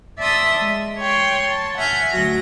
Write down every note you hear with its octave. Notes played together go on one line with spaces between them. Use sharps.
D5 E5 A5 C6 D#6 E6
G#3
C#5 G5 C6
A5
E5 F#5 G#5 F6 G6
D2 F#3 F#4 A#6